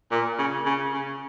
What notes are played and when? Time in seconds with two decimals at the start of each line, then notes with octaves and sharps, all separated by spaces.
0.11 A#2
0.38 C#3
0.66 C#3
0.93 C#3